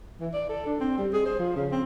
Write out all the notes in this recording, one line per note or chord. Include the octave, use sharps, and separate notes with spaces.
E3
D5
A4
D4
C4
G3
G#4
C5
F3
C#3
C4